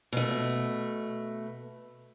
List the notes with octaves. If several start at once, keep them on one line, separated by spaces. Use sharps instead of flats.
B2 A3